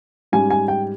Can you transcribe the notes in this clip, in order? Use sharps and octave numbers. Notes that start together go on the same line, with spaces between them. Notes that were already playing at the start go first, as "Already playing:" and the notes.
G#2 G3 C#4 G#5
G#5
G5